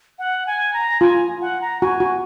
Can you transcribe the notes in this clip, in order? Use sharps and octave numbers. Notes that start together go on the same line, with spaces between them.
F#5
G#5
A#5
F4 G#5
F#5
A#5
F#4 G#5
F#4